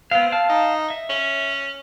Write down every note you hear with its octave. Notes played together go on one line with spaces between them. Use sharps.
B3 C4 F5
F5 A5 F6
D#4
E5
C#4